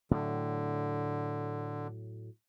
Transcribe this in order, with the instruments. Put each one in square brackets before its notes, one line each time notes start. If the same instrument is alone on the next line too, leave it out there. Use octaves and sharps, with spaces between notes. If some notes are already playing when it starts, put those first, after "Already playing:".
[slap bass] A2 F#3 [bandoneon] D3